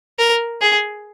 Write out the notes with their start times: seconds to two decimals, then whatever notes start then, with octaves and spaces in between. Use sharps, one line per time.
0.19 A#4
0.61 G#4